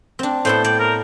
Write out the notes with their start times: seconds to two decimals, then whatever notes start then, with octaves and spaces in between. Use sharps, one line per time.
0.19 C4 D4
0.45 A2 B3 A4 C5
0.64 D5 G5
0.79 A#4